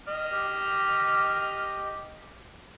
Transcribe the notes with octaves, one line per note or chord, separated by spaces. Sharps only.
D#5 F6
G4